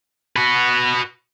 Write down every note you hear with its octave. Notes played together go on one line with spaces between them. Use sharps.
F#4 B4